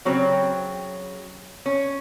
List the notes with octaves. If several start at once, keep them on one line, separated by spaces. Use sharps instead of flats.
C#3 F#3 C4
C#4